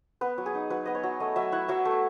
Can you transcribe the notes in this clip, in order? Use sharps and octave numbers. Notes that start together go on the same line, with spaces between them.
B3 B4
F#3
G#4
D#4
F#3 B4
B3 D#5
C#5
F#3
A3 D#5
F#3 E5
E4 F#5
F#3 E5
A3